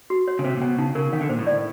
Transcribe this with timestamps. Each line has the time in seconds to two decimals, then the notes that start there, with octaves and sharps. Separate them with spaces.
0.10 F#4
0.28 C#5
0.39 C#3
0.44 C3 C5
0.57 A#2
0.62 B2 G5
0.78 C#3 D#4
0.95 C#3 A#4
1.13 D#3 F5
1.21 D3
1.29 A#2 C5
1.39 A2
1.47 D5